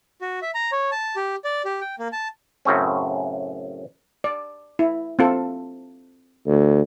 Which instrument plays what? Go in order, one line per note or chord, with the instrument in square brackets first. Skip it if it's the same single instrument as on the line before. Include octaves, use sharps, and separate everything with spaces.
[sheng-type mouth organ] F#4
E5
A#5
C#5
A5
G4
D5
G4
G5
A#3
A5
[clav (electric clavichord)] F#2 A2 C#3 C4 C#4
[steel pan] D5
E4
C4 F4 A4
[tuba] D2